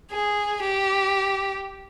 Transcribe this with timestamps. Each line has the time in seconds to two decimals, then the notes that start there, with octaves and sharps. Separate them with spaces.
0.11 G#4
0.63 G4